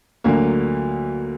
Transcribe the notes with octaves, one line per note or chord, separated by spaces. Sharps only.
D2 D3 F#3 A#3